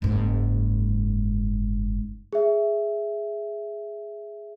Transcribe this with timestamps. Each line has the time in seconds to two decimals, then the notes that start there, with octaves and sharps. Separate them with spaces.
0.02 F#1 G#2
2.33 G#4 E5